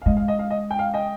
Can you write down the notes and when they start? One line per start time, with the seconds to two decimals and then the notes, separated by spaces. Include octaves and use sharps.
0.02 F5
0.06 G#3 D#5
0.17 F5
0.28 D#5
0.39 F5
0.50 D#5
0.71 G5
0.79 F5
0.94 D#5 G5